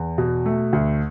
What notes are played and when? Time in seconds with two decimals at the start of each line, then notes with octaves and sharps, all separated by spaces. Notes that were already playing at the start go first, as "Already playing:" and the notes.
Already playing: E2
0.18 B2
0.46 A3
0.73 D2